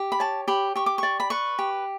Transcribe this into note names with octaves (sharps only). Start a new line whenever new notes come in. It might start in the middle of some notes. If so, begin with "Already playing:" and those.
Already playing: G4
B5
C#5 A5
G4 B5
G4 C#6
D6
D5 C#6
B5
B4 C#6
G4